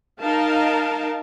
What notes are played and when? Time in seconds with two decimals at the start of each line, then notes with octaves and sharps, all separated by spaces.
0.20 D#4 A#4 F5 A5